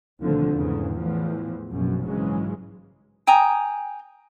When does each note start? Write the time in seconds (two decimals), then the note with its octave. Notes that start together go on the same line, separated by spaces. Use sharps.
0.21 D#2 B2 D3 F3 A3 C4
0.53 E2 G#2 C#3
0.93 E2 A2 E3 F3
1.69 A#1 F#2 B2
2.04 G#2 C#3 E3 F#3 G#3
3.27 G5 G#5 A#5 D#6